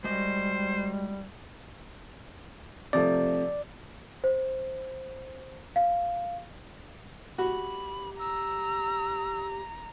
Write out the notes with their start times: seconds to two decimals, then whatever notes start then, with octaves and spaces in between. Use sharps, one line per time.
0.04 G3 G#3 F#4 C5 D#5
2.93 C3 F3 A3 D5
4.24 C5
5.76 F5
7.38 F#4 G4 B5
8.19 A#5 E6